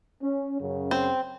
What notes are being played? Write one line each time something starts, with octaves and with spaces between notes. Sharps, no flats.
C#4
F#2 C#3 F#3
C4